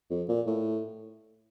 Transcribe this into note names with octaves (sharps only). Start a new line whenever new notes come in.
F2
A#2
A2